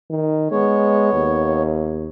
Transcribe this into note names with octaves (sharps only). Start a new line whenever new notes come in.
D#3
G#3 B3 C#5
D#2